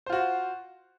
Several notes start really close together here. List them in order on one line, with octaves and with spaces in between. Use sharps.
C5 F4 F#4